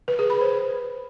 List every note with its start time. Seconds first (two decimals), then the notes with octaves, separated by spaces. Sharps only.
0.08 B4
0.19 G#4
0.30 B5
0.41 C5